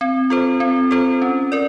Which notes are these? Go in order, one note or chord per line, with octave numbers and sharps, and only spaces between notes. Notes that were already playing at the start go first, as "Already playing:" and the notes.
C4
F4 A4 C5
C4
F4 A4 C5
C#4
A#4 D5